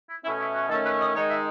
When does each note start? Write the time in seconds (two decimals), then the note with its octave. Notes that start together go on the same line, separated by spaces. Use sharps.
0.09 E4
0.24 B2 A3 C#4 E4
0.39 E4
0.54 F#4
0.69 D#3 A3 C#4 A4
0.84 B4
0.99 D#5
1.14 D#3 G#3 D#4 C#5
1.29 E5